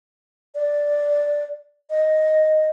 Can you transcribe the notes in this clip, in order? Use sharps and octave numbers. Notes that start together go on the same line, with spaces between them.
D5
D#5